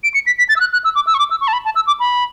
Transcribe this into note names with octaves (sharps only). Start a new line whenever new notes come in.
D7
C#7
B6
B6
A6
E6
F#6
F#6
E6
D6
E6
C#6
D6
E6
C#6
A5
B5
A5
E6
D6
B5